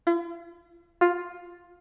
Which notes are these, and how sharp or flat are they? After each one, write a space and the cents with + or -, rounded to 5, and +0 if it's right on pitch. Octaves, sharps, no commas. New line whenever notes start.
F4 -45
F4 +10